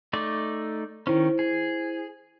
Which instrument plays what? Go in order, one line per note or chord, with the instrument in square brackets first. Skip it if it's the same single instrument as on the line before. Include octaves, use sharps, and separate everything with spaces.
[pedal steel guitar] A3 D#4 D5
[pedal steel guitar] D#3 C#4 [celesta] E4 C5
[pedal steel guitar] G#4